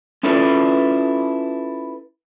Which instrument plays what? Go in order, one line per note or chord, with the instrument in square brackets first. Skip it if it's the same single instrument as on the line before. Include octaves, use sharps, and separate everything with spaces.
[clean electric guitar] C#4 E4 F4 A4 B4